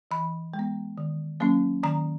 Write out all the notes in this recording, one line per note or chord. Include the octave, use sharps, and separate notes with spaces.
E3 B5
G#3
B3
D#3
F#3 A#3 C#4
D#3 A#5